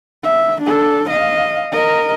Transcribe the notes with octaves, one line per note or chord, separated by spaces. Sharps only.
E5
D4 A4
D#5 F5
A#4 D#5